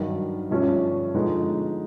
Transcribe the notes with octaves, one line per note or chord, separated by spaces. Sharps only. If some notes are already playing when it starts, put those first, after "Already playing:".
Already playing: G2 D#3 F#3
G2 D3 F3 A3 C#4
D3 F3 G#3 B3 D#4